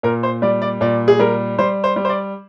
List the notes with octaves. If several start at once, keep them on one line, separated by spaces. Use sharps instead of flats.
A#2 A#4
C5
G3 D5
D5
A#2 D5
G#4
G3 A#4
G3 C5
C5
G3
C5
D5